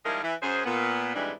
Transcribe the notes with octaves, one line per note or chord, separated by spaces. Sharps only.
D#3 F3 G3 G#3 E4 A#4
E3
F#2 G#4 C5
A#2 B3
F2 G#2 E3 G3 G#3 D4